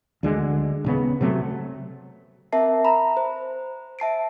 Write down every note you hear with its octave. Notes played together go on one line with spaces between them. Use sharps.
D2 D3 G#3
D#1 C#3 B3
C3 F#3 A3
C4 A#4 E5 A5 C7
A#5 B5
C5
E5 A5 C7 D7